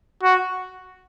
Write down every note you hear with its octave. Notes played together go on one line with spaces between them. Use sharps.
F#4